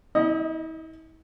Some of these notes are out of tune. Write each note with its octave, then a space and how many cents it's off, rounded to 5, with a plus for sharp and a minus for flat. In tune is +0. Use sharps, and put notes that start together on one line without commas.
E4 -45 D#5 +0